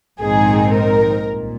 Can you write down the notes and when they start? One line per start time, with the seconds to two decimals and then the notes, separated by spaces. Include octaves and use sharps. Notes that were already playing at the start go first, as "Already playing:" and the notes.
0.20 A#1 G#2 D#3 C4 D#4 G#4
0.74 A#4
1.28 C2 A#2